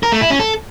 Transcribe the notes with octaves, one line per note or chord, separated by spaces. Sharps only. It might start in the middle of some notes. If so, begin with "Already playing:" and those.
A#4
A3
E4
C#4
A4